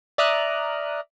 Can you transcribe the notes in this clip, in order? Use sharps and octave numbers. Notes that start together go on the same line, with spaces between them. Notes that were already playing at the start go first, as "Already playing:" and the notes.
D5 E5 A#5 D#6 F6 F#6